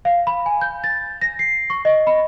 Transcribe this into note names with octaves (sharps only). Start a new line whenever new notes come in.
F5
B5
G#5
G6
A6
A#6
C7
C#6
D#5
B5